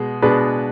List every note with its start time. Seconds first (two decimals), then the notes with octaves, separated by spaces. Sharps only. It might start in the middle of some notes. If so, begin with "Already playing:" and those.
Already playing: B2 G#3
0.22 B2 G#3 D4 G#4 B4